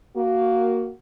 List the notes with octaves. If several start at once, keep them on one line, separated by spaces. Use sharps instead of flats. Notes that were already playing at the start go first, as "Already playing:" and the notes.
A#3 F#4